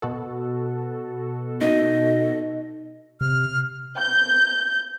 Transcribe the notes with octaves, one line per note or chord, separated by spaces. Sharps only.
B2 F#4 A4
D#4 D#5
C3 F6
G6